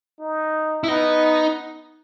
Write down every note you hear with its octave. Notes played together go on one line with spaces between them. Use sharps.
D#4
E4
B3 D#4